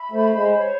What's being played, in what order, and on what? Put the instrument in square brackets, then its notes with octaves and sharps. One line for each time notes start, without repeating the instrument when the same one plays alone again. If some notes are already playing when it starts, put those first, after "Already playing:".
Already playing: [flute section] E5 B5
[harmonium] A3 [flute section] C5
[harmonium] G#3
[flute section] C#5